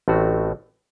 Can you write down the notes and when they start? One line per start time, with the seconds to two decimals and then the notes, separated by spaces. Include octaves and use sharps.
0.08 A1 A2 A3 C4 F#4